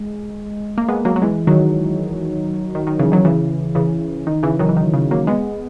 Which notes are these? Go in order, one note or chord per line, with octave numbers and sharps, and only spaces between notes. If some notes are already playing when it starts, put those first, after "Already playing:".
Already playing: G#3
A#3
G#3 B3
F#3 A#3
F#3
E3 G#3
D#3 F#3
D#3
D#3
C#3 E3
D#3 F#3
C#3 E3
C#3 E3
D#3
C#3 E3
D#3 F#3
E3
D#3
C#3
F#3 A#3
G#3 B3